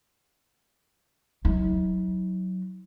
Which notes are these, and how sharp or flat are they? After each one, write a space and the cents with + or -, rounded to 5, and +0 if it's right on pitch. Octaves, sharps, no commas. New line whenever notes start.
F#3 +0 D#4 +45